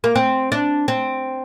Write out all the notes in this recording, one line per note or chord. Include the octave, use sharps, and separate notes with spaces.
A#3
C4
D4
C4